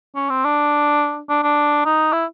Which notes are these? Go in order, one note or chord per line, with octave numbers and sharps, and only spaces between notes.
C#4
C4
D4
D4
D4
D#4
E4